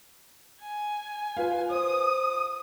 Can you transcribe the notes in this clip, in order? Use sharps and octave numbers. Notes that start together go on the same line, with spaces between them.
G#5
F4 B4 F5
C5 D#6